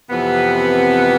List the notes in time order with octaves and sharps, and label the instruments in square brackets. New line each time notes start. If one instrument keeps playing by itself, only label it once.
[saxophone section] F2 C3 E3 B3